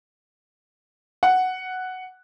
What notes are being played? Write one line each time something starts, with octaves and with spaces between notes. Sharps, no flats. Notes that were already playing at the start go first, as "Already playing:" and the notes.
F#5